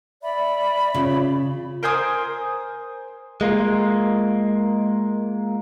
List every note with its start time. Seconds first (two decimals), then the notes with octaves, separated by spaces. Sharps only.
0.23 D5 E5 B5
0.94 C#3 F4
1.83 A#4 C5 G#5 D#6
3.41 G#3 A#3 F4